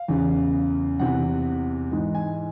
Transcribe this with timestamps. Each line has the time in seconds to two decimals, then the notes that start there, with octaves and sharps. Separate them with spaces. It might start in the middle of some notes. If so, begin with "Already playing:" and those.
Already playing: F5
0.08 E2 C#3 E3
0.99 E2 C3 E3 F#5
1.92 G#2 E3
2.15 G#5